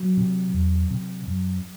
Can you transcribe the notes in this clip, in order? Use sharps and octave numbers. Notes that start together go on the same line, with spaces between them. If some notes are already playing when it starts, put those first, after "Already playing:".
Already playing: F#3
C3
E2
C3
F#2